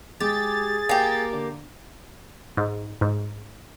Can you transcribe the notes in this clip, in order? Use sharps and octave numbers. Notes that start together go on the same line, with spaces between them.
G#3 G4 G#4 A6
A#3 G4 G5 G#5
D3
G#2
G#2